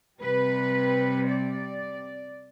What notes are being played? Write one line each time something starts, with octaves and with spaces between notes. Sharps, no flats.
C3 G3 B4
D5